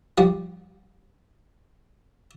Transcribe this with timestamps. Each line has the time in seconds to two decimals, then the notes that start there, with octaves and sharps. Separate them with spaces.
0.18 F3 G3